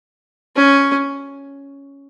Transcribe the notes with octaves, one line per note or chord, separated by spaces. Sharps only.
C#4